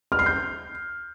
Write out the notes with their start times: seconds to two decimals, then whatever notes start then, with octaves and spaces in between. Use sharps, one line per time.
0.12 F6
0.19 C7
0.26 G6